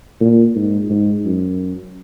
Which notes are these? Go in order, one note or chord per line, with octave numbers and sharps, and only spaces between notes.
A#2
G#2
G#2
F#2